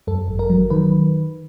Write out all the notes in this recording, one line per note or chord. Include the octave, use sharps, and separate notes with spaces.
F#2 A4
G#1
A#4
F#3
D#3 B4